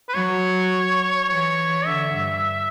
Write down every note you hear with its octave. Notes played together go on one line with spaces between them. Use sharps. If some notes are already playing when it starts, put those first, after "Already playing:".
B4
F#3 C#5
E3 C#5
D3 E5
G2